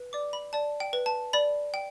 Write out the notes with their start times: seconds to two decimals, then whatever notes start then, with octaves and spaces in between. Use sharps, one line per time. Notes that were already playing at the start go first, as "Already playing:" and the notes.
Already playing: B4
0.13 D5 D6
0.33 B5
0.53 D5 A5
0.80 G5
0.93 B4
1.06 A5
1.33 D5 B5
1.74 G5